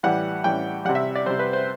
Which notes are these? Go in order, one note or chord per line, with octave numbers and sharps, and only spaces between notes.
A2 E3 G3 F#5
A2 E3 G3 G5
C3 G3 F#5
E5
D5
C3 G3 C5
B4
C5